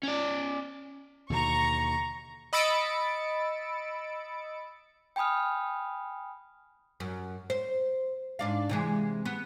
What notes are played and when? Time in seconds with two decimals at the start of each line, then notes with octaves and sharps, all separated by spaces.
0.03 C#4 D5
1.30 D#2 B2 D3 A#5 C#6
2.53 D#5 B5 E6 A6 C#7 D7
5.16 G5 G#5 B5 D#6 F6
7.00 F#2
7.50 C5
8.39 G#2 D4 F5
8.69 C3 E3 G#3
9.25 B3